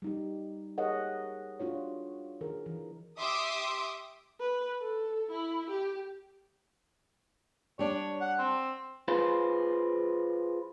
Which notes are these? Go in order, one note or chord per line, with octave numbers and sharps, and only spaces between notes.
G3 D#4 G4
G4 G#4 A#4 C#5 D#5 F#5
D4 F4 F#4 C#5
D#3 G#4 A#4
E3
G4 E5 C6 D6 D#6
B4
A4
E4
G4
G3 D4 C#5
F#5
C4
F4 G#4 B4 C5